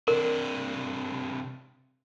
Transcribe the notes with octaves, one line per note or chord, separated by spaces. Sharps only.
C3 D4 A#4